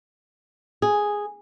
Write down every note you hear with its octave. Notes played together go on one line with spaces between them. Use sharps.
G#4